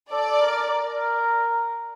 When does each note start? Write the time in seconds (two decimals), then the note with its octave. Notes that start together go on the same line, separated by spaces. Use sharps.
0.11 A4 D5
0.40 A#4
0.70 A#4